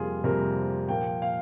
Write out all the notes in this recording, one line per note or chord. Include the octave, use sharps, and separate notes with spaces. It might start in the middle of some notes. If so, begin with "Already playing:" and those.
Already playing: F2 C3 G3 A#3 F4 G#4
F2 C3 G3 A#3 A#4
A#2 F3 A#3 G5
F5